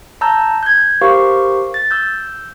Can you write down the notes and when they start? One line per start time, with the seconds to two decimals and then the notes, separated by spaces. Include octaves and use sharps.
0.21 A5 A#5 E6 G6
0.63 G6 G#6
1.01 G4 A#4 C5 F5 C#6
1.74 A6
1.91 E6 G6